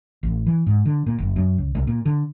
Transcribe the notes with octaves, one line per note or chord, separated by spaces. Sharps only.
A1
E3
G#2
D3
A#2
F#1
F#2
C#2
C2
A#2
D3